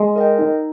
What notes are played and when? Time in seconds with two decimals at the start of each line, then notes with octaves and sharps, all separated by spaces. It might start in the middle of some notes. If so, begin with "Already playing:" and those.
Already playing: G#3
0.16 A#4 D#5 G5
0.39 D#4